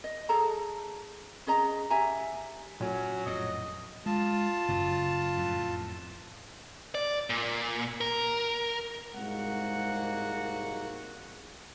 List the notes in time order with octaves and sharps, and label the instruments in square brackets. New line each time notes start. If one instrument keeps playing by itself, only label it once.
[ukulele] D#5
G#4 A4 A5 A#5
C#4 G#4 D#5 A#5
G4 E5 G#5 A#5
[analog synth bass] A#2 [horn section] F#3 [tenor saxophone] C#4
[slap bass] F2 A2 [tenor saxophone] D#5
[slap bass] G#3 [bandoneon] F4 A5
[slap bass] F#1 F#2 F#3
F2 A2
[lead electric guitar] D5
A#2
A#4
[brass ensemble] C2 G#2 G#3 A#3 F#4 F#5